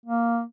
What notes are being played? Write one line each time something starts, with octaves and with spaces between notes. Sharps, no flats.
A#3